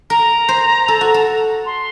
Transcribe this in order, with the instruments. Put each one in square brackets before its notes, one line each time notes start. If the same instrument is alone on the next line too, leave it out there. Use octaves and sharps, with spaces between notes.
[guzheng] A#4 [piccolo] A#5
[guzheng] C5
A4
F#4
A4
[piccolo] C6